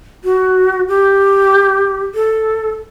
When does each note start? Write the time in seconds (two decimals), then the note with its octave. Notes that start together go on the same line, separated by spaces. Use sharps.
0.24 F#4
0.88 G4
2.15 A4